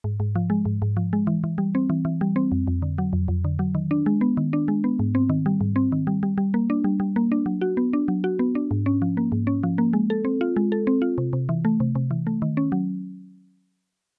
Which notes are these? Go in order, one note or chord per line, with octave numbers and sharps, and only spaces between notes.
G#2
G#2
F3
G#3
G#2
G#2
F3
G#3
E3
E3
G3
C4
E3
E3
G3
C4
F2
F2
D3
F#3
F2
F2
D3
F#3
D#3
D4
G#3
B3
D#3
D4
G#3
B3
G#2
C4
D#3
G3
G#2
C4
D#3
G3
G3
G3
A#3
D4
G3
G3
A#3
D4
F#3
F#4
B3
D4
F#3
F#4
B3
D4
G#2
C#4
F3
A#3
G#2
C#4
F3
A#3
G#3
A4
C4
F4
G#3
A4
C4
F4
C3
C3
E3
A3
C3
C3
E3
A3
D#3
C#4
F#3